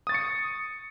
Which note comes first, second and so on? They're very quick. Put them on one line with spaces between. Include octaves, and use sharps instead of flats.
D#6 A6 C#6 C#7